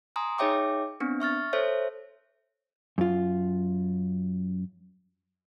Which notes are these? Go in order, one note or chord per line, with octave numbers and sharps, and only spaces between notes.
G#5 A#5 C6 D#6
D#4 G#4 C#5 E5 G5 D6
B3 C4 D4
E5 C#6 F6 A6
A4 C5 C#5 E5
F#2 F4